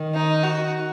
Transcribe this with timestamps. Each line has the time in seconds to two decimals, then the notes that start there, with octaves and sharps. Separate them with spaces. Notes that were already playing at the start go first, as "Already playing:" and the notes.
Already playing: D#3
0.14 D#4
0.43 F#4